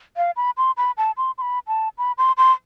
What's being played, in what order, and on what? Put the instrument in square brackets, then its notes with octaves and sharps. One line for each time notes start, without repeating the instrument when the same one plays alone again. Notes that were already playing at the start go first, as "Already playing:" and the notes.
[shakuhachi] F5
B5
C6
B5
A5
C6
C6
B5
A5
B5
C6
C6